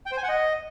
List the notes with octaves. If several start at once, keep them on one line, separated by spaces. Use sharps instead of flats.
G5
C5
G#5
F#5
D#5